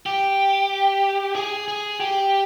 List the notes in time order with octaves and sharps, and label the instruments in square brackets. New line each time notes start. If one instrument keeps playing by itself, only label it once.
[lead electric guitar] G4
G#4
G#4
G4